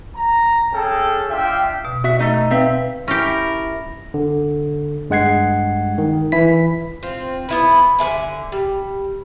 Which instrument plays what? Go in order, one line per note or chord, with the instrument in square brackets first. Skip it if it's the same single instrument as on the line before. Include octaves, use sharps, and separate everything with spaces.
[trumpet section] A#5
C#4 G#4 A4 G5 A5
D4 F4 E5 G5
[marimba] B2
[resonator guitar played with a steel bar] F#4 E5
A3 D#4 D#5
[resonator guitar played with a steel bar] C4 E5 [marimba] B4 F5 G5
[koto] C#4 G4 [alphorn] E4 [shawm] A#4
[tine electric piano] D3
G2 G#3 F#5 G#6 C7
D#3
E3 E4 B6
[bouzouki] C4 F4
B3 E4 B4
D3 B4 E5 G#5
G3